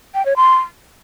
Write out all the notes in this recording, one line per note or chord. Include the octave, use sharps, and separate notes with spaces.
G5
C#5
C6